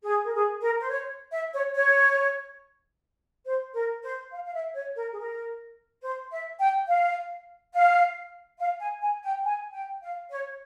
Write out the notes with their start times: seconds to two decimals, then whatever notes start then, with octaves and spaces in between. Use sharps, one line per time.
0.04 G#4
0.25 A#4
0.33 G#4
0.62 A#4
0.80 C5
0.90 C#5
1.32 E5
1.53 C#5
1.75 C#5
3.46 C5
3.74 A#4
4.04 C5
4.32 F5
4.45 F5
4.54 E5
4.75 C#5
4.96 A#4
5.12 G#4
5.18 A#4
6.02 C5
6.31 E5
6.60 G5
6.88 F5
7.74 F5
8.60 F5
8.80 G#5
9.02 G#5
9.24 G5
9.45 G#5
9.73 G5
10.02 F5
10.31 C#5